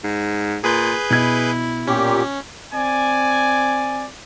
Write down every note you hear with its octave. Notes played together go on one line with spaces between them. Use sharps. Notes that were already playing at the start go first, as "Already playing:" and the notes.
G#2
A#2 G#4 B4 G6
B2 E4 G#6
A#2 C#4 G4
C4 D5 G#5